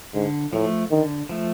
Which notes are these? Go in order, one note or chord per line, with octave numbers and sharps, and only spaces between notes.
G#2 D3
A2 F3 A3
D3 D#3
F3 A3